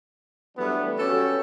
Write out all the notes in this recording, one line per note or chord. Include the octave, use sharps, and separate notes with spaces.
E3 F#3 G3 A3 B3 D4
C#4 F#4 G4 A4 B4 C#5